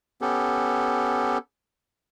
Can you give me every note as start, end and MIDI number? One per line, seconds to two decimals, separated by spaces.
0.22 1.38 59
0.22 1.38 61
0.22 1.38 67
0.22 1.38 69